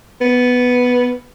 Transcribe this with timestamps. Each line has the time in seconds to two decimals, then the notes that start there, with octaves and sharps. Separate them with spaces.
0.21 B3